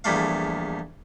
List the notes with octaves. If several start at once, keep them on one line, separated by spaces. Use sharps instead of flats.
A#1 E2 G3 A3 F5